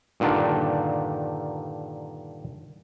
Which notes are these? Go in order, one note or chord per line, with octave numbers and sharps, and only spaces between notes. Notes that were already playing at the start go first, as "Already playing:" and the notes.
G2 A#2 D3 D#3 D4